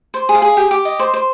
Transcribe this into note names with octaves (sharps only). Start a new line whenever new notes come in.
C5
G#4
F5
G#4
G4
G4
D#5
C5
C5